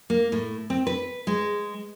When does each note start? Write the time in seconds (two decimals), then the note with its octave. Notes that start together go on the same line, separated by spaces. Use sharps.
0.10 A#3
0.32 A2
0.70 C4
0.87 B4
1.27 G#3